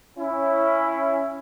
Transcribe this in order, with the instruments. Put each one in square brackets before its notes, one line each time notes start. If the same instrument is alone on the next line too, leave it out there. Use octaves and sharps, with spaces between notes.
[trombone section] C#4 E4